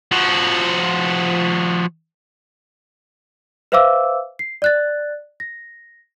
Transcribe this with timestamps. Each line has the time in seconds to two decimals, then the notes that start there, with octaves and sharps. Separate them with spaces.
0.12 F3 F#4
3.72 B4 C5 E5 F5 D6 E6
4.39 C7
4.62 D5 F#6 A6
5.40 A#6